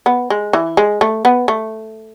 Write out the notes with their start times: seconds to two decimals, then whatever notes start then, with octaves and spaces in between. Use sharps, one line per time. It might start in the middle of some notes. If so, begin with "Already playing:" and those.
0.06 B3
0.30 G#3
0.53 E3
0.77 G#3
1.01 A3
1.25 B3
1.48 A3